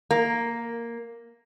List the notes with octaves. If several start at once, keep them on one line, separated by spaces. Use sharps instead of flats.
A#3